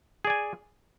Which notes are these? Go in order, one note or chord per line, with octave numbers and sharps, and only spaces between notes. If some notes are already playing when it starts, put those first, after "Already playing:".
G#4 D5 G#5